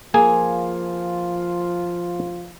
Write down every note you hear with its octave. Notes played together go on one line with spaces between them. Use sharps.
F3 A#3 F4 G#4 G#5